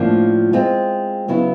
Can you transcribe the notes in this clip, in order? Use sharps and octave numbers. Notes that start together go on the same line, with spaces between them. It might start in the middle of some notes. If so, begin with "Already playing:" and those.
Already playing: A2 F3 A#3 D4
G#3 C4 F4
C#3 F#3 B3 E4